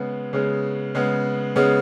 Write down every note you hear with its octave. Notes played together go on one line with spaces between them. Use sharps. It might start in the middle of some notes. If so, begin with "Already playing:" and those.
Already playing: C#3 G#3 B3
C#3 G#3 B3
C#3 G#3 B3
C#3 G#3 B3